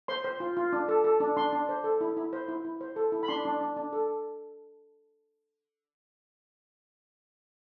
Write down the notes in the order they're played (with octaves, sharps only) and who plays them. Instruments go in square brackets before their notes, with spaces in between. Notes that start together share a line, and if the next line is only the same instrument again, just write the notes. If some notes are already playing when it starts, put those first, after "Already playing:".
[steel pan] C5 C6
C5
F4
F4
D4
A4
A4
D4
D4 C6
D4
C5
A4
E4
E4
C5
E4
E4
C5
A4
E4
B5
D4 C6
D4
D4
D4
A4